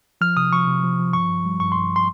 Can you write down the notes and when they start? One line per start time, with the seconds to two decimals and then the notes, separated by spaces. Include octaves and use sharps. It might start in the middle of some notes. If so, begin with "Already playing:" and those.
0.21 F3 F6
0.37 C3 D#6
0.53 F3 C#6
0.67 C3
0.84 F3
0.99 F3
1.13 G2 C#6
1.29 G2
1.45 G3
1.60 G2 C#6
1.72 G2 C6
1.96 C6